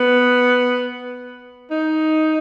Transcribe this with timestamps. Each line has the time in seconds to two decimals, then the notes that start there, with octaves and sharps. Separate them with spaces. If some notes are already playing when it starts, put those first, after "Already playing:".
Already playing: B3
1.71 D#4